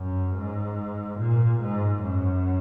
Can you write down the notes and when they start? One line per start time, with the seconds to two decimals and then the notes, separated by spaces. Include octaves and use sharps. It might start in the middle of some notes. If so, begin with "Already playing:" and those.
Already playing: F#2
0.35 G#2
1.19 A#2
1.61 G#2
2.02 F#2